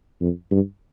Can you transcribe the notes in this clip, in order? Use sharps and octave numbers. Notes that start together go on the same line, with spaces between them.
F2
G2